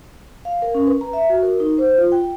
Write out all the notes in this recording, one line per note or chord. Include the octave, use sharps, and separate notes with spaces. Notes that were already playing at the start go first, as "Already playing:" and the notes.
F5
A#4
C#4
B4
A#5
E5
F#4
A#4
D#4
C5
F4
G5